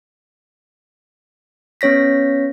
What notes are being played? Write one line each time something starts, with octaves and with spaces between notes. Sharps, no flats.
B3 C#4 C#5 A#6 B6